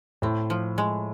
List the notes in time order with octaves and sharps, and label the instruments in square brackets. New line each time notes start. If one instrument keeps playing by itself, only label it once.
[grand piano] A2 [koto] C4
[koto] F3
G#3